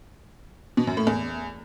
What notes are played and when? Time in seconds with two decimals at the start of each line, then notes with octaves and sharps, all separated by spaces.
0.77 B2
0.87 F#2
0.97 A2
1.07 E2